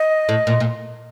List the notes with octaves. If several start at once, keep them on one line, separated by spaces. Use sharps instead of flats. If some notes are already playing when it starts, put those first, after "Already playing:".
Already playing: D#5
A2
A#2
A#2